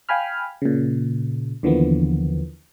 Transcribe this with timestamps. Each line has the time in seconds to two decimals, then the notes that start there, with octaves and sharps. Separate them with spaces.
0.09 F5 G5 G#5 B5 F6
0.62 A#2 C#3
1.63 D#2 D3 E3 F3 A#3 B3